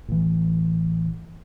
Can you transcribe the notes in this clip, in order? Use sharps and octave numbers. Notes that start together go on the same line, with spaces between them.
A1 E3